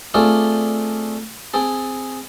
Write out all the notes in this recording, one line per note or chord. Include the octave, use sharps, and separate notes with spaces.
A3 C4 D4 F4 G#4 A4
C4 G#4 A5